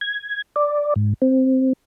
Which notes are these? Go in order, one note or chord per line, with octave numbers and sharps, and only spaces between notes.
G#6
D5
G#2
C4